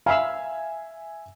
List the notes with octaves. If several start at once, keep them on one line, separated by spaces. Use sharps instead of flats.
E5 F5 G#5 B5 E6